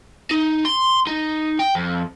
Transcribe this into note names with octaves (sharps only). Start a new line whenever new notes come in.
D#4
C6
D#4
G5
F2